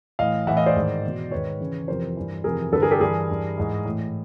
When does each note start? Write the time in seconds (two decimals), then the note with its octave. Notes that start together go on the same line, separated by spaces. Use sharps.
0.19 A2 E3 D#5 F5
0.47 A2 E3 E5 F#5
0.57 D#5 F5
0.66 C5 D5
0.76 G#2 D#3
1.04 E2 B2
1.31 G#2 D#3 B4 C#5
1.60 E2 C#3 E3
1.88 F2 C3 E3 A#4 C5
2.17 G2 E3
2.44 F2 C3 E3 G#4 A#4
2.72 G2 D3 A4 B4
2.82 G#4 A#4
2.91 G4 A4
3.01 G2 E3 G#4 A#4
3.29 G2 E3
3.57 G#2 E3
3.85 A2 E3